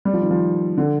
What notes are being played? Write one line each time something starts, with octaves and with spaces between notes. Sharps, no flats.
G3
F3
D#3
F3
D3